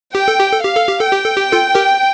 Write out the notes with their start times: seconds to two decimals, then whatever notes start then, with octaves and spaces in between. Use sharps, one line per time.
0.15 G4 G5
0.28 A4
0.40 G4
0.52 A4
0.61 G4 F5
0.76 A4
0.88 G4
1.00 A4
1.06 G5
1.12 G4
1.24 A4
1.37 G4
1.52 F4 A4
1.75 G4 A#4